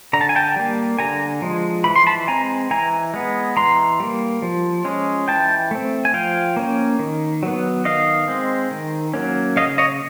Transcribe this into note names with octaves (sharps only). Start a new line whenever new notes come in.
D3 A#5
A5
G#5
G5 A5
G3 A#3
D3 G#5 A#5
F3 G#3
E3 B5
C6
A5 B5
G#3 C4 G#5 A#5
E3 G#5 A#5
G#3 B3
E3 A#5 C6
G3 A#3
F3
G#3 C#4
E3 G5 A5
A3 C4
G#5
F3 F5 G5
A#3 C#4
D#3
F#3 B3
D#3 D#5 F5
G#3 C4
D#3
F#3 A#3 C#4
C#3 D#5 F5
C#5 D#5